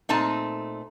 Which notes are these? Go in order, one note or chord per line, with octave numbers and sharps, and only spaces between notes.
A#2 A3 C4 D#4 A5